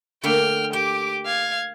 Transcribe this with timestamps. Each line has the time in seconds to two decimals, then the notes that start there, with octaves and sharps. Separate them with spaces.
0.23 D3 A3 A#3 G5 F6
0.73 G4 G5 D6
1.25 F5 G#6